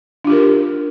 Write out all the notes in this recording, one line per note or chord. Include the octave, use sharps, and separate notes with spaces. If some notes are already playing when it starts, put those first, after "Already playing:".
D4 F4 G4 A#4